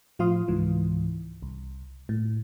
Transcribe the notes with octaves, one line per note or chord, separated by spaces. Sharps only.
A2 F3 F4 F5 C6 D#6
C#2 G#2 E3
C2
A2